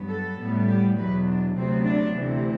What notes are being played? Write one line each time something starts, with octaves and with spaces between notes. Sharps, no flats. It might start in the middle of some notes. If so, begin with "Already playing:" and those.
Already playing: G2 F#3 B3
A4
A2 G3 B3
G4
E2 B2 F#3 B4
D4
D2 C3 F#3 B3 C4
D4
D2 C3 E3